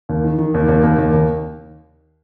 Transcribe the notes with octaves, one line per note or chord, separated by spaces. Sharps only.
D#2
D#3
D#3
D#2
D#2
D#2
D#2
D#2